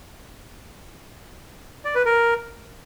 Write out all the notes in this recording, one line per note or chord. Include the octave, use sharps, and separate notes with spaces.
D5
B4
A#4